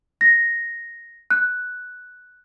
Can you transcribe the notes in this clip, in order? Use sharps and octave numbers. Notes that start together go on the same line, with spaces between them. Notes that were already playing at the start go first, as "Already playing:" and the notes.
A#6
F#6